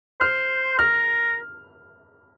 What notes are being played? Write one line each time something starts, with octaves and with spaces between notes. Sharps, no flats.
C5 F6
A#4 F6